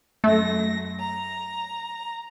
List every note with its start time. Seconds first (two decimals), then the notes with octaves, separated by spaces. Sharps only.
0.24 F#2 A3 A#6
0.99 A#5